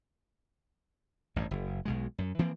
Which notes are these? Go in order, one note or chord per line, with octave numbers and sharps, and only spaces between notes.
A1 G2
F#1
B1 B2 G#3
F#2
E3 F3 A#3 C4